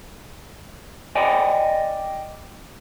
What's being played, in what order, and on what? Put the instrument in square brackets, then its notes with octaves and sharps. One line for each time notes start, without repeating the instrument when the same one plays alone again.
[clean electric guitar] D5 D#5 G5 G#5